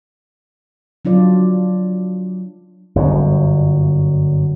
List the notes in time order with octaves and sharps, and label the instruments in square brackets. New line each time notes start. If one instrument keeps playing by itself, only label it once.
[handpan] F#3 D4 F4 D5
[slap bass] G1 F#2